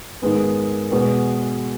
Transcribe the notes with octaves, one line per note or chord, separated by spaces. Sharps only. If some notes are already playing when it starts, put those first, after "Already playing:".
G#2 D#3 G#3 B3
E2 B2 G#3 B3